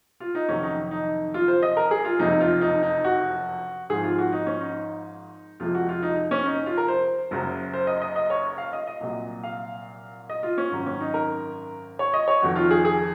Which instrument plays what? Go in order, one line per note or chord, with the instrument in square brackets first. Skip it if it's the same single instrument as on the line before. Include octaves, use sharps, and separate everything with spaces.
[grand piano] F4
D#4
F2 C3 D#3 F#3 C#4
D#4
D#4
F4
C5
D#5
A#4
G#4
F4
F#1 F2 C3 F3 D#4
F4
D#4
D#4
F#4
G#1 G#2 F3 G#3 G#4
F4
F#4
D#4
C#4
D#4
F2 C3 F3 G#3 F4
F#4
F4
D#4
C#4
D#4
F4
A#4
C5
F#1 F#2 C#3 F#3
C5
D#5
D#5
D#5
C#5
F5
D#5
D#5
C2 A#2 F#3
F5
D#5
F4
C#4
G#1 F#2 D#3 F#3
C#4
D#4
A#4
C#5
D#5
C#5
F1 F2 D#3 F#4
F4
G#4
G#4